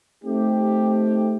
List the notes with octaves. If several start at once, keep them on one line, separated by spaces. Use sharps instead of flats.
A3 C4 D#4 G4